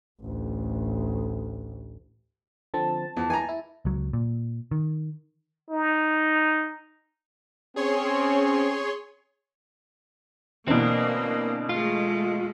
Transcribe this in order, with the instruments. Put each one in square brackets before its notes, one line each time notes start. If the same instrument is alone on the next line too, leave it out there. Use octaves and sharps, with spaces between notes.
[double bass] A1 D2
[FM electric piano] D3 F3 C4 [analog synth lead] A5
[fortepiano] E2 [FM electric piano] F3
[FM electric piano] E3 [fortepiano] G#5 A#5
[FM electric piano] E4
[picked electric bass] C#2 F#3
A#2
D#3
[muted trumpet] D#4
[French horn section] C4 C#4 [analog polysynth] G#4 C#5 C6
[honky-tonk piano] B2 D3 E3 [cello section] A#3 [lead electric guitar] C4 D4
[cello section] G#3 A3 [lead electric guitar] F4